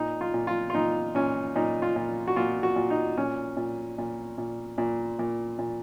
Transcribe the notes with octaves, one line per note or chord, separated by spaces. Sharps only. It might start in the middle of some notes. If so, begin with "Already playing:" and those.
Already playing: A#2 D#4
F4
A#2
F4
F4
A#2 D#4
A#2 C#4
A#2 D#4
F4
A#2
F#4
A#2 F4
F#4
A#2
D#4
A#2 C#4
A#2
A#2
A#2
A#2
A#2
A#2